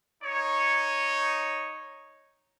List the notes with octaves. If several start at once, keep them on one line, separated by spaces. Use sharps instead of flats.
D#4 C#5